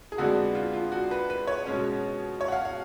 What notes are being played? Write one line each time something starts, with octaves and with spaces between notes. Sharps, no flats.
G#4
F2 D3 G#3 B3 D4 F#4
F4
F4
F#4
B4
B4
C#5
B2 G#3 C#4
C#5
F#5
F5
F5